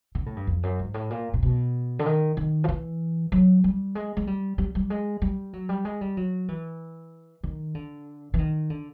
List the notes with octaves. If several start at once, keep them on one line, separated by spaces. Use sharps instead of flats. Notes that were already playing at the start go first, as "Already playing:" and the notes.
D3
A2
G2
F2
F#2
G#2
A2
A#2
A#2
B2
D3
D#3
D#3
F3
E3
F#3
G3
G#3
G#3
G3
G3
G3
G#3
G3
F#3
G3
G#3
G3
F#3
E3
D#3
D3
E3
D#3
D3